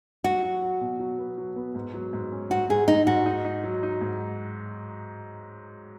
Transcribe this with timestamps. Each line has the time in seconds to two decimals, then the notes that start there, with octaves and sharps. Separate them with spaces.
0.24 F#3 F#4
0.43 F#3
0.62 F#3
0.81 B2
0.99 F#3
1.18 B3
1.38 F#3
1.56 B3
1.75 G#2
1.94 F#3
2.13 G#2
2.32 C#4
2.50 G#2 F#4
2.69 G#2 G#4
2.88 G#2 D#4
3.07 G#2 F#4
3.26 D#4
3.45 D#4
3.64 F#3
3.83 D#4
4.01 G#2